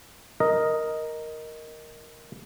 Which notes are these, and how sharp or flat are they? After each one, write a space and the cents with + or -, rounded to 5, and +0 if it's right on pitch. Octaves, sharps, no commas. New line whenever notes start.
A#4 +0 D#5 +0